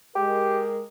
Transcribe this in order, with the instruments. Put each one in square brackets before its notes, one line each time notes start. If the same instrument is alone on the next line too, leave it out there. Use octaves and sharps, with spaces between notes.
[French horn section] G#3 A#4 [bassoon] G4